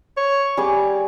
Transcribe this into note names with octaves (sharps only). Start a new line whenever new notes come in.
C#5
G3 G#4 D6